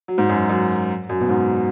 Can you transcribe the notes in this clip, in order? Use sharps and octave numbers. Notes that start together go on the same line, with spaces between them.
F#3
G#2
F#2
F#2
F#2
B2
G#2